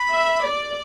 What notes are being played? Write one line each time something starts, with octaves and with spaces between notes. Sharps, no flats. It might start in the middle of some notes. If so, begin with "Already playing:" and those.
Already playing: B5
E5
D5